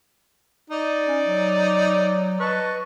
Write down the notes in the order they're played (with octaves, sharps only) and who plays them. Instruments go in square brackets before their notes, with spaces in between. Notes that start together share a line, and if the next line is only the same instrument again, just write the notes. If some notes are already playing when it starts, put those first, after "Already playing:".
[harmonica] D#4 D5
[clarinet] C#4
F#3
[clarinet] B4 [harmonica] D#5 A5 C#6